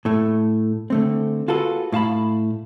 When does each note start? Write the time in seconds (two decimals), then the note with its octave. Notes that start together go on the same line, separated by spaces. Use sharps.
0.05 A2 A3
0.90 D3 A3 C4
1.48 F4 F#4 G#4 A4 B4
1.92 A2 F5 A5 B5